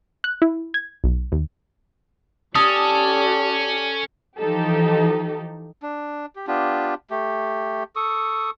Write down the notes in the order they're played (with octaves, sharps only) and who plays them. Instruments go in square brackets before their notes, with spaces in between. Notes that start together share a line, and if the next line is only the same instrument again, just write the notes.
[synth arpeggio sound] F#6
E4
G#6
B1
D#2
[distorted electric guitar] C#4 [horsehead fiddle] G4 D5 [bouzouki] A4 [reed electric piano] D#6
[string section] E3 F3 D#4 G4 A4
[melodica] D4
G4
B3 D4 F4 G4
A3 G4
A4 C#6 D#6